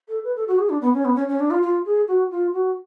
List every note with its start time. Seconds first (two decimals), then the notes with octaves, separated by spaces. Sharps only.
0.08 A4
0.24 B4
0.36 A4
0.48 F#4
0.59 G#4
0.70 D4
0.81 B3
0.94 C#4
1.05 B3
1.16 C#4
1.28 C#4
1.40 D4
1.51 F4
1.62 F4
1.86 G#4
2.08 F#4
2.31 F4
2.54 F#4